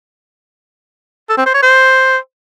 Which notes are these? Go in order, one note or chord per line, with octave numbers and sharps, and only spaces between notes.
A4
C4
C5
C#5
C5